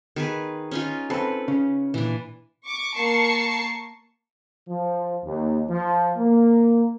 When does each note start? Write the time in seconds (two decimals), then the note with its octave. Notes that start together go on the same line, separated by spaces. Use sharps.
0.16 D#3 G#4 B4
0.71 C#4 D#4 F4
1.10 C4 A4 B4
1.48 C#3 C#4
1.94 A#2 E3 D4
2.65 C#6 D6
2.96 A#3 A5 C#6 C7 C#7
4.69 F3
5.25 D#2
5.70 F3
6.17 A#3